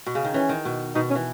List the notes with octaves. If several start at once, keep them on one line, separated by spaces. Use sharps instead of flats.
B2
C#3
D#3
E3 C#4
D#3
B2
B2 D#4
C#4
E3